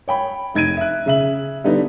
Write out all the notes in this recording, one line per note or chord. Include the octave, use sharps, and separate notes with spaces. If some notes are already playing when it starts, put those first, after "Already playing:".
C#5 G5 B5
F1 D#4 G#6 D7 D#7
E5 F#6
C#3 E5 F#7
D3 G3 B3 D#4